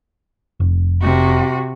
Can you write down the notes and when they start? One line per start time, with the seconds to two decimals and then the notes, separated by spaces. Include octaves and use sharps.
0.60 F1
1.02 C3 F#4